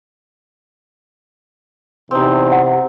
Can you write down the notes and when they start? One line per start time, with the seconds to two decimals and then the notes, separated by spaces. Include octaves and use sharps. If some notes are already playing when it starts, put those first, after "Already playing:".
2.11 E2 C3 C4 D#4
2.52 F#5